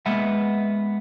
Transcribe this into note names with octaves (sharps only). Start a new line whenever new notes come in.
G#3 A#3 B3 B4 E5 F#5